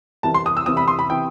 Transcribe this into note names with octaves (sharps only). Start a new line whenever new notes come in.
C2 C3 E3 A5
C6
D#6
E6
C2 C3 E3 D#6
B5
C6
B5
C3 E3 G5